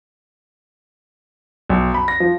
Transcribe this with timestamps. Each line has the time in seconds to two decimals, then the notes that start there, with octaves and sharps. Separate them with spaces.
1.69 B1
1.94 B5
2.08 A#6
2.20 F3